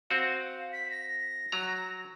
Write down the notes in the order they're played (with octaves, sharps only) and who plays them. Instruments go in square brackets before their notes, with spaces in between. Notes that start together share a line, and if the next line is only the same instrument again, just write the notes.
[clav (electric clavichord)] C4 F#4 [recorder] F5
[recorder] B6
A#6
[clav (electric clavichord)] F#3 A#5